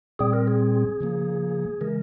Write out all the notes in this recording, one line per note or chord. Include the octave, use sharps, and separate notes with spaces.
A#2 G3 C4 G#4
A#4
G#4
C#3 F3 A#3
C#3 E3 G#3 A#4